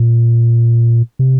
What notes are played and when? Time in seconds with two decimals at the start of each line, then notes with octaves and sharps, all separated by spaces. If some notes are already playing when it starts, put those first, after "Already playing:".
Already playing: A#2
1.19 C3